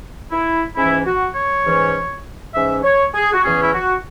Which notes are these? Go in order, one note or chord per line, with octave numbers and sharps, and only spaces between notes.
E4
G#2 E3 C#4 E4
F#4
C#5
G#2 E3 C#4
G#2 E3 C#4 E5
C#5
G#4
F#4
E2 E3 C#4 G#4
E4
F#4